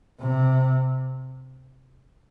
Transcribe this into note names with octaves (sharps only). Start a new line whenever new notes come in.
C3